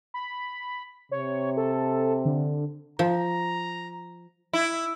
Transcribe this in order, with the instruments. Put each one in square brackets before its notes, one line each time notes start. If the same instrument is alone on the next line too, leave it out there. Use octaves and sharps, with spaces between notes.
[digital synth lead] B5
[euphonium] C3 [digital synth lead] C#5
[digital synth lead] A4
D3
[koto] F3 [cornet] A#5
[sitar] E4